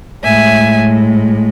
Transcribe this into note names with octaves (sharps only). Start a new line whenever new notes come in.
A2 G#3 E5 G#5